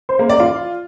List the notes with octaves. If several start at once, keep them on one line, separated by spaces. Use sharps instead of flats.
C5
A#3
D5
F4